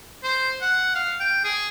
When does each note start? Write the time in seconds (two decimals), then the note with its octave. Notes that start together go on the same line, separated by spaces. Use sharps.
0.24 C5
0.61 F#5
0.95 F5
1.20 G5
1.44 G#4